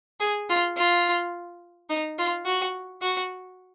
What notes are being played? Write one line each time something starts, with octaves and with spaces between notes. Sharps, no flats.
G#4
F4
F4
D#4
F4
F#4
F#4